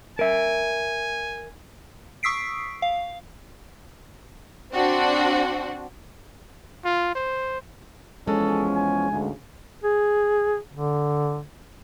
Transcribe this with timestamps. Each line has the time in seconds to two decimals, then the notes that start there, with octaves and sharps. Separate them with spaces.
0.19 A#4 E5 G#5
2.23 C#6 D#6 E6 B6 C7 D7
2.82 F5
4.73 C4 D4 F#4
6.85 F4
7.15 C5
8.28 E2 F3 G#3 C#4 A4
8.74 G#5
9.11 D2 G#2 C#3
9.84 G#4
10.73 D3